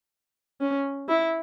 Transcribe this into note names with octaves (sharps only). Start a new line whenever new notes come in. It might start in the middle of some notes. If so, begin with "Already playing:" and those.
C#4
E4